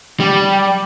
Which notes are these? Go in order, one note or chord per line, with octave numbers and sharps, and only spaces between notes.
G3